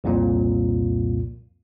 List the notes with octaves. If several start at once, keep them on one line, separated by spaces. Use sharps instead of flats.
C2 F2 A#2